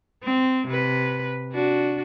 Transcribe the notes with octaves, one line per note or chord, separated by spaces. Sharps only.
C4
C3 B4
D4 F#4